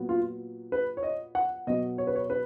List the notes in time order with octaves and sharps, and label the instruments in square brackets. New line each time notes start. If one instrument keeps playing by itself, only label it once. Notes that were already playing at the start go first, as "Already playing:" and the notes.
Already playing: [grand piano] A#2 F#3 B3
F4
B4
C#5
D#5
F#5
B2 F#3 B3 D#5
C#5
B4
C#5
B4